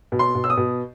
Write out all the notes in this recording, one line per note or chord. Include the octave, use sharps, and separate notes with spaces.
B2
C6
B2
E6
D#6
B2